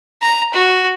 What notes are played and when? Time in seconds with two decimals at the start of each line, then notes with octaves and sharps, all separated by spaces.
0.22 A#5
0.53 F#4